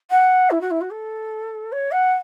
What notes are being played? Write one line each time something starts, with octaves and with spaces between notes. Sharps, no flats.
F#5
E4
F#4
E4
F#4
A4
C#5
F#5